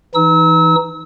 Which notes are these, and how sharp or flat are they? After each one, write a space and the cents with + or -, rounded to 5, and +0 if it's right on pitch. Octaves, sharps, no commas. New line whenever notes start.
E3 +0 D#4 +5 E6 -35